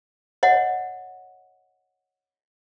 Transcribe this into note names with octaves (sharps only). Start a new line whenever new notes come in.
C#5 D#5 F#5